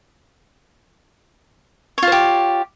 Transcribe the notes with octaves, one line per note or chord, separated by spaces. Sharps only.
F4 G4 C5 C#5